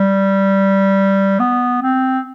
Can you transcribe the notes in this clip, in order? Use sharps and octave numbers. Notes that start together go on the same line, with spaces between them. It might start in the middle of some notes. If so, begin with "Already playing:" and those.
Already playing: G3
B3
C4